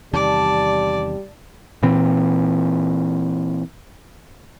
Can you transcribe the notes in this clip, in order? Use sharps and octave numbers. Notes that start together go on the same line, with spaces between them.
E2 C3 D#3 G3 D5 A5
A#2 E3 C4